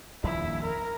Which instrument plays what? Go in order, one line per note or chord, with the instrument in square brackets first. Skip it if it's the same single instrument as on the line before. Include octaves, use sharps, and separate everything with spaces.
[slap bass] D#1 A#1 F2 [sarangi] E4
[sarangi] A#4